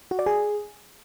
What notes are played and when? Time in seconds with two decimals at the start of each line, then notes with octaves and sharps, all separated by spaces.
0.11 F#4
0.19 D5
0.26 G#4